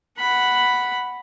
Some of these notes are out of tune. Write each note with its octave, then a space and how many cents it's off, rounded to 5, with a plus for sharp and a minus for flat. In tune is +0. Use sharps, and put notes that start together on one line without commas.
F#5 +0 B5 +0